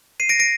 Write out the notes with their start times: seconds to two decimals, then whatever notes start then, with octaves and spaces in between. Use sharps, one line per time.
0.20 C7 D#7
0.29 A#6 D7
0.39 A#6 D7